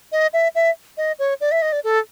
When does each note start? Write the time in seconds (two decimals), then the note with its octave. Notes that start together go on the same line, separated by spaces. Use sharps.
0.12 D#5
0.33 E5
0.55 E5
0.97 D#5
1.19 C#5
1.41 D5
1.51 E5
1.62 D#5
1.72 D5
1.84 A4